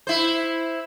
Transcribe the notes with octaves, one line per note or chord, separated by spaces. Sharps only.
E4 C5